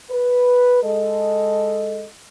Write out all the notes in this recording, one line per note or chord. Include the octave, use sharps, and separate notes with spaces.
B4
G#3 A4 D#5